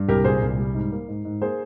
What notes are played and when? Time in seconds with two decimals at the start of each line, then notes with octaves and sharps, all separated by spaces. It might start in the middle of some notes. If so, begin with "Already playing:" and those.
Already playing: G2
0.08 C2 G4 A#4
0.24 A#2 G#4 C5
0.42 C2
0.58 G3
0.75 G#2
0.92 A#3
1.08 G#2
1.25 G#2
1.41 A#3 G#4 C5